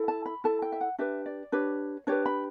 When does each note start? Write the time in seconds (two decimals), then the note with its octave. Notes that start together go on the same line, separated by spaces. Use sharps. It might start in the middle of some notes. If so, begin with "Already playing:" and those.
Already playing: E4 A4
0.08 A5
0.26 B5
0.44 E4 A4 A5
0.62 G5
0.72 E5
0.81 F#5
0.98 D4 G4 B4 E5
1.26 D5
1.52 D4 G4 B4 C#5
2.07 D4 G4 B4 C#5
2.26 B5